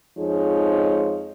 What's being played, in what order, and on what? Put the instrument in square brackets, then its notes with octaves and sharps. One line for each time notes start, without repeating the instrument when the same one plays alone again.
[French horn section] F2 F3 G#3 D#4 G#4 C#5